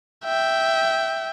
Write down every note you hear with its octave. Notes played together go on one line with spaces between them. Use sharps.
E5 G5